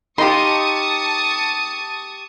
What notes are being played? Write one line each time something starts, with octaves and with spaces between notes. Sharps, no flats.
D#4 G4 D#5 F5 A5 C6 C#6 D#6